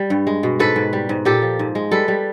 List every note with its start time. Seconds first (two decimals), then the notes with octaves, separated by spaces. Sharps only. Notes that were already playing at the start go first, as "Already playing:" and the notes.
Already playing: G3
0.10 G2
0.27 G#3
0.43 B2
0.60 G#2 A4 B4
0.76 G#2
0.93 G3
1.09 G#2
1.25 A#2 G4 A4
1.42 F3
1.59 G#2
1.75 G#3
1.91 G3 A4 B4
2.08 G3